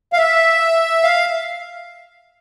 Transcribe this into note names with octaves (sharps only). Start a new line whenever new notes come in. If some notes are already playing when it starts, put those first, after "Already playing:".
F5
E5
F5